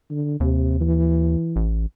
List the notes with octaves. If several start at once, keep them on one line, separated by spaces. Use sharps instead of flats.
D3
D#2 C3
E3
A1